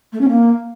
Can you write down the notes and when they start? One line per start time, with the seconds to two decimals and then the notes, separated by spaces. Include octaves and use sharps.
0.12 A3
0.20 C#4
0.28 A#3